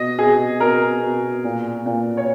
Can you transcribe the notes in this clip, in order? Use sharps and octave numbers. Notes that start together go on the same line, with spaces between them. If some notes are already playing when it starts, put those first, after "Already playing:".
Already playing: B2 D#5
B2 G#4
B2 A#4
B2
A#2
A#2
C#5